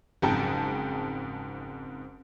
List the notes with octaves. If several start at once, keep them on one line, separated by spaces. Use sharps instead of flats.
F#1 F2 G#2 G#4 G5 A5